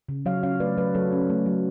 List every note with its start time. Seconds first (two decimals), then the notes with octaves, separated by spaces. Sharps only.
0.09 C#3
0.26 F#3 C#5 F5
0.43 C#4 C#5 F5
0.60 A3 B4 D5
0.77 F#3 B4 D5
0.94 F#3 A4 C#5
1.12 C#4
1.30 A3
1.46 F#3